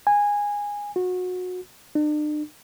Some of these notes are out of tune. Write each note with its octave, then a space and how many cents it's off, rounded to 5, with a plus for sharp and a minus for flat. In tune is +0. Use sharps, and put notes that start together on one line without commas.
G#5 -15
F#4 -25
D4 +45